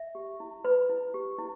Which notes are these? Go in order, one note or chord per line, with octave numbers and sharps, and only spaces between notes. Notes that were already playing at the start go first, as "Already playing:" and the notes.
Already playing: E5
G4
E4
B4 B5
E4
G4
E4